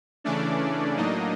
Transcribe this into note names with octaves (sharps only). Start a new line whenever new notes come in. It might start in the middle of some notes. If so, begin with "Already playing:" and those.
C#3 E3 A3 C#4 D4 D5
A2 F#3 A#3 D4 D#4 D#5